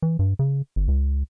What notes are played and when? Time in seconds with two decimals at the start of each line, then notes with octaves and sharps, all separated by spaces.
0.02 E3
0.19 G2
0.39 C#3
0.76 G1
0.88 C#2